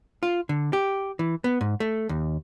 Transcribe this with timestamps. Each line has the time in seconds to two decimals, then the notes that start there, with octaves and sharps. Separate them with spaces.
0.23 F4
0.49 D3
0.73 G4
1.19 E3
1.44 B3
1.61 G#2
1.80 A3
2.09 D#2